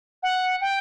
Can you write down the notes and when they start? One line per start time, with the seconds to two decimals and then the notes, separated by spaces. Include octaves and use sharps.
0.23 F#5
0.61 G5